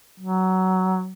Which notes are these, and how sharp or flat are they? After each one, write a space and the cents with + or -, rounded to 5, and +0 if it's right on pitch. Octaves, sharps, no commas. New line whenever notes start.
F#3 +15